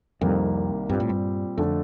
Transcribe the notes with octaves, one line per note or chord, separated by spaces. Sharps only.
C2 F2 C3 D#3 G3 A#3
G2 A#2 G3 C4
A2
G2
F2 D3 A3